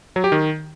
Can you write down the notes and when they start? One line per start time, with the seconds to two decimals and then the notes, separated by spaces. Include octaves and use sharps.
0.16 F#3
0.24 G4
0.32 D#3